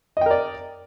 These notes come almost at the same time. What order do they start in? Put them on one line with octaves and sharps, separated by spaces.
D#5 G5 A#4 D5